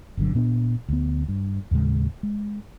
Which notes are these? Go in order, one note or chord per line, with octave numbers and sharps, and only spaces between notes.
G1 B2 D3 F#3
A#2 B3 D4
D2 B3
G2
D#2 A2 C#3 G#3
G#3